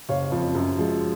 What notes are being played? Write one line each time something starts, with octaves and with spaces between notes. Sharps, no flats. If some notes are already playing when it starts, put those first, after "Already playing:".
F#1 C#5 F5
F2 F3
F#2
F3 G#3